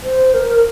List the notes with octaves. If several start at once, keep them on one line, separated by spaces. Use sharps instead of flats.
C5
A#4